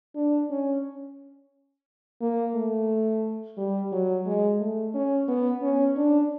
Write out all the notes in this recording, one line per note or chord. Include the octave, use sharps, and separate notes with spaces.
D4
C#4
A#3
A3
G3
F#3
G#3
A3
C#4
B3
C#4
D4